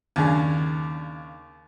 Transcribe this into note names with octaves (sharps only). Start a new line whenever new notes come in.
D#2 C#3 D4